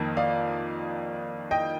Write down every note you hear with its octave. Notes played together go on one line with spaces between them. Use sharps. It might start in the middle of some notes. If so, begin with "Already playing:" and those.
Already playing: F2 D#3 A#3
D5 F5
D#5 G5